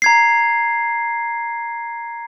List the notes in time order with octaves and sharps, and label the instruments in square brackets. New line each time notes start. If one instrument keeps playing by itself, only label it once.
[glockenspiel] A#5 G#6 C7